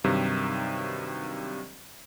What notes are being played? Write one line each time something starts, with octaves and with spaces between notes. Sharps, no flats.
G2 C3 D#3 F#3